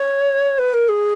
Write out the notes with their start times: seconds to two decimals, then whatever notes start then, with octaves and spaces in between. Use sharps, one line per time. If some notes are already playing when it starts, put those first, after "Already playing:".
Already playing: C#5
0.58 B4
0.73 A#4
0.88 G#4